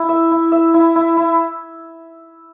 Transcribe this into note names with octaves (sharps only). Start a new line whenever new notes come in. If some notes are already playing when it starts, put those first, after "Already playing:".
Already playing: E4
E5
E4
E5
E4
E4
E4